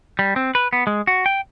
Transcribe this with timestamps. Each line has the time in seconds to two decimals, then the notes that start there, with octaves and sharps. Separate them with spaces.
0.19 G3
0.36 C4
0.55 B4
0.73 B3
0.87 G#3
1.07 F#4
1.26 G5